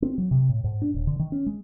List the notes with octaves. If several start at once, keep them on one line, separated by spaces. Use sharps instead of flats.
C4
F#3
C3
A2
G#2
D4
D#1
D3
D#3
C#4
G#3